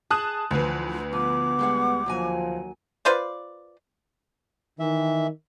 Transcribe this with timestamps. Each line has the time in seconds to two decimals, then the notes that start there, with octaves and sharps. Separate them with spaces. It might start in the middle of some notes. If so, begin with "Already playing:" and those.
0.11 G#4 A5 D#6 F#6
0.51 D2 E3 F3 B4
1.13 F3 B3 D6
1.59 G3 G#3 F#5
2.06 D#2 F3 F#3 G#5
3.05 F4 B4 C5 D5
4.80 D#3 E3 E5